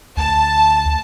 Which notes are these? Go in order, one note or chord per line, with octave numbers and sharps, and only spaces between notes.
D2 A5